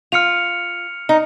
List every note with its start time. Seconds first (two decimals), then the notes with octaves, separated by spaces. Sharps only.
0.12 F4 F6 C#7 F7
1.09 D#4